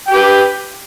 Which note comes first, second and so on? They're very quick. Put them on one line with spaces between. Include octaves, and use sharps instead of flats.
G5 G4 B4